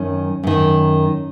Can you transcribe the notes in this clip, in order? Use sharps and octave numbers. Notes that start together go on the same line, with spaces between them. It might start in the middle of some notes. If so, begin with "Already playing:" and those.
Already playing: F#2 D#3 C#4
F#2 D#3